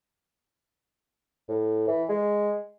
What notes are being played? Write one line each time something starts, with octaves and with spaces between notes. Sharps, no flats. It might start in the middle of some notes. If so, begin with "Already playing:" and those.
A2
E3
G#3